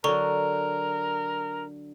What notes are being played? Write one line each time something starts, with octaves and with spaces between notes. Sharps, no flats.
D3 F#3 A#4 A#5 C#6 G7